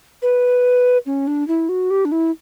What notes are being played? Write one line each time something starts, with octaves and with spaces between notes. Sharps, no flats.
B4
C#4
D4
E4
F#4
G4
D4
E4